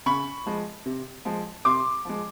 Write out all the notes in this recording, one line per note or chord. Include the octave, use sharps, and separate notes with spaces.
C#3 B5 C#6
F3 G#3
C3
F3 G#3
C3 C6 D6
F3 G#3